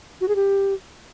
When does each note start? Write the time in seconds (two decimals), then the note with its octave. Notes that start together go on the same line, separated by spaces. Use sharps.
0.21 F#4
0.28 G#4
0.36 G4